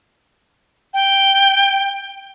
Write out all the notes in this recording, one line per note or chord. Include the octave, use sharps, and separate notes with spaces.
G5